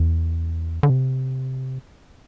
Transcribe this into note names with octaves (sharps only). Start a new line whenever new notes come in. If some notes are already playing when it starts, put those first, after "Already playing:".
Already playing: E2
D3
C3